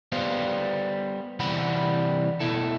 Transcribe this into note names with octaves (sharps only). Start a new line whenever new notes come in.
G3 B3 C5 F5
C3 E3 G3 C4 F#5 B5
B2 E4 A4